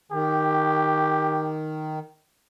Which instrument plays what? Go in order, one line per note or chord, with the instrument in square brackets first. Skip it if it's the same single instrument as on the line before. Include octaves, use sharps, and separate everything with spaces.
[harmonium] D#3 [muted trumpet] G4